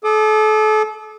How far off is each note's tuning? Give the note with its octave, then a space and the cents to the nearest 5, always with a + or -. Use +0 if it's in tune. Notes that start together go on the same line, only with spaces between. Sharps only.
A4 -35 D6 +45